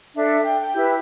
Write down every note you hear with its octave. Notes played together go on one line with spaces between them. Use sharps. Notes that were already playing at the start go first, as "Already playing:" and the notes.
D4 A4 E5
G5
G5
E4 G4 B4 G6
E6